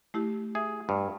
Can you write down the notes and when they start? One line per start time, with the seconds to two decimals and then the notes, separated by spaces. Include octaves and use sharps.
0.14 A3 E4 G4
0.55 G#4 E5
0.89 G2